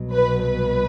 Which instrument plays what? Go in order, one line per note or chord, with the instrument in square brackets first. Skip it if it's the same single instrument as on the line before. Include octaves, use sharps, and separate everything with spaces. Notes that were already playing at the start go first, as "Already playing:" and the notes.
Already playing: [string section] C2 B2 F#3
B4
B4